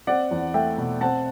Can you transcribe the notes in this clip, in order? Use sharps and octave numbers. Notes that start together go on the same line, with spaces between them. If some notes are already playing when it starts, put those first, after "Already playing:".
C4 D5 F#5
E2
A3 E5 G5
B2
C4 F#5 A5